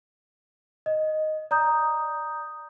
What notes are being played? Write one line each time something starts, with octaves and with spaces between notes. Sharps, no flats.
D#5
D5 A#5 D#6 G6